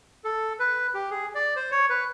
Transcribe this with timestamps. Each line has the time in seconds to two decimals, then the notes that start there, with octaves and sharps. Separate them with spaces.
0.24 A4
0.60 B4
0.94 G4
1.11 G#4
1.35 D5
1.56 C5
1.71 C#5
1.90 B4